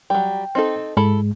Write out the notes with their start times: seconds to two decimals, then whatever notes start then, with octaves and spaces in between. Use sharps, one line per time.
0.10 F#3 G3 G5
0.55 C4 D#4 A4
0.97 G#2 G#3 E4 A4 B5